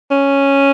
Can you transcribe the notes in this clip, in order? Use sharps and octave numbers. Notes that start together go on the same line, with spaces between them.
C#4